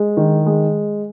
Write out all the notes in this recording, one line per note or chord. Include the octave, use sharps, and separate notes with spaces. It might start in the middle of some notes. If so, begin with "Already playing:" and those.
Already playing: G#3
D#3
G#3